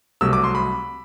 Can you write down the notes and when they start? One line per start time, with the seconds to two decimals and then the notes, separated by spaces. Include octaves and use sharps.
0.21 C2 C3 F#3 A3 E6
0.33 D6
0.44 C6
0.55 B5